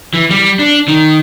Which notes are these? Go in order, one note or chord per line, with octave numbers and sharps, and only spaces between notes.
E3
G3
D4
D#3